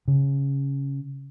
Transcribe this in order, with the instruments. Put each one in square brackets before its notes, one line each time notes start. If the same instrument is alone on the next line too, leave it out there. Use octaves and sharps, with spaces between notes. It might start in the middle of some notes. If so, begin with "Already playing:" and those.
[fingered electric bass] C#3